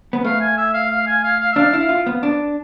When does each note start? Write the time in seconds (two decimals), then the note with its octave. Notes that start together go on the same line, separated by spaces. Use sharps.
0.13 B3
0.25 A3 F5
0.41 G#5
0.57 E5
0.74 F5
0.91 F5
1.07 G#5
1.24 F5
1.40 F5
1.52 E5
1.56 D4 F5
1.73 E4
1.78 F5
1.89 F4
2.06 B3
2.23 D4